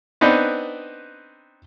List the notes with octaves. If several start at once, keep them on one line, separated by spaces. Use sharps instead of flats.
B3 C4 D4 D#4 B4